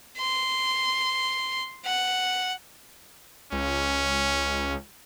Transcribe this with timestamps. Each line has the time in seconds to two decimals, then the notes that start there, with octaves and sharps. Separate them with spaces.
0.17 C6
1.84 F#5
3.52 C#2 C#4